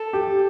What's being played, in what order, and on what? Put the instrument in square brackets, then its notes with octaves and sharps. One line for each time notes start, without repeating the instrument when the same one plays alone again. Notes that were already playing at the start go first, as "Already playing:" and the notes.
Already playing: [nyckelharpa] A4
[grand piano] G4